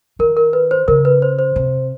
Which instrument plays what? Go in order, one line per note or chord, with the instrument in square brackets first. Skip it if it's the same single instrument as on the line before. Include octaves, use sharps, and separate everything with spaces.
[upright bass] D#3 [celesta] A#4
[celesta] A#4
B4
C5
[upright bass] C#3 [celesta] A#4
[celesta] B4
C5
C5
[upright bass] C3